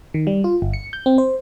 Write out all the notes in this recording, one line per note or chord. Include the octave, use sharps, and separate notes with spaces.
D#3
G3
F4
G1
C#7
G6
C4
C5